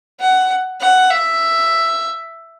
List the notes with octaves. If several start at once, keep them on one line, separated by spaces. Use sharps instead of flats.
F#5
F#5
E5